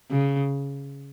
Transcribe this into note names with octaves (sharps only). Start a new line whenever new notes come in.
C#3